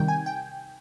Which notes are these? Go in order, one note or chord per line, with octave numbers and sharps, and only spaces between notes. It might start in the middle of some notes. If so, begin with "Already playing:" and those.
Already playing: C3 D#3 G3 G5
G#5
G5